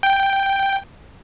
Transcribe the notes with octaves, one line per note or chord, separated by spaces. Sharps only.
G5